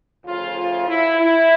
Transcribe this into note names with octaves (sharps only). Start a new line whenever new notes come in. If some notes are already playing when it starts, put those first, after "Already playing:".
D2 C#3 F3 A3 F4
F4
E4
E4